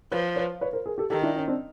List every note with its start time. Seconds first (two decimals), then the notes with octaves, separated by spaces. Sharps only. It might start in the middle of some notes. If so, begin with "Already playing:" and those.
0.11 F3 B4 C#5
0.36 B4 C#5
0.61 B4 C#5
0.73 A#4 C5
0.86 G#4 A#4
0.98 G4 A4
1.10 D#3 G4 A4
1.23 D4 E4
1.36 C#4 D#4
1.48 C4 D4